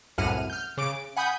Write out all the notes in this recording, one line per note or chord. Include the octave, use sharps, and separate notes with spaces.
C2 F#2 A2 F#5 F6 D#7
F6 G6
C#3 D6 D7
F#5 G#5 B5 D#6 G6